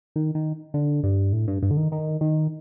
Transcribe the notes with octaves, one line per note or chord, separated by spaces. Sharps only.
D#3
D#3
D3
G2
A2
G2
G2
D3
D#3
D#3
D#3